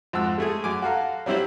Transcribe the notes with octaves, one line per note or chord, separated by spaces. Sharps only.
F2 G#2 F#4 E6
G#3 A3 G#4
F#2 G#5 D6
F#4 A4 F5 A#5
F#3 G3 C4 E4 G4 C5